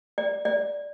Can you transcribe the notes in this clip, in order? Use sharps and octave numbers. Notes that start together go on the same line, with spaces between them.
D5
D5